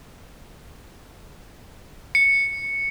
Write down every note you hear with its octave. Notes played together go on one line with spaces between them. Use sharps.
C#7